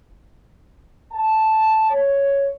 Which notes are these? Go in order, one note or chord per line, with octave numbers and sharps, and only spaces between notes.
A5
C#5